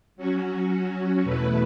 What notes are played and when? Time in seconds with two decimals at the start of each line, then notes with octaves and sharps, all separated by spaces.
0.16 F#3 C#4 F#4
1.23 E2 B2 A3 E4 B4